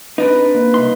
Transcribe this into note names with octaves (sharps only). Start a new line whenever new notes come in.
C4 D4 D#4 B4
A#3
C2 D#4 C6